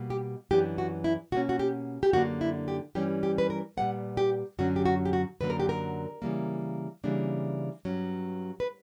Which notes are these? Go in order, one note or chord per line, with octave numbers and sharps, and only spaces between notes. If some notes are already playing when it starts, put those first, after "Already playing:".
Already playing: B2 G3 A#3
G4
F#2 E3 B3 D4 G4
F#4
E4
B2 A#3 C#4 F#4
F#4
G4
G4
F#2 D3 A#3 D4 F#4
E4
G4
G2 E3 G3 C#4 G4
G4
B4
A#4
A#2 G3 B3 F#5
G4
F#2 D3 F#3 C#4 F#4
G4
F#4
G4
F#4
F#2 D3 F#3 A#3 B4
A#4
G4
A#4
C#3 E3 G3 A#3
C#3 E3 G3 A#3 D4
G2 F#3 C#4
B4